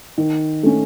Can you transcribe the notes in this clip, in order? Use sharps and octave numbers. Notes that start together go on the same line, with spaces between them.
D#3
A3 C#4